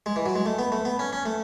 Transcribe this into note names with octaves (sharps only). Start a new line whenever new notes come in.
G#3
E3
F#3
G#3
A3
B3
A3
B3
C#4
C#4
A3